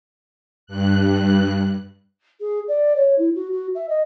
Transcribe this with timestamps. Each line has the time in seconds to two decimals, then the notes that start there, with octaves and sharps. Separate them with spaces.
0.66 G2 F#6
2.40 G#4
2.68 D5
2.96 C#5
3.18 E4
3.35 F#4
3.52 F#4
3.74 E5
3.89 D#5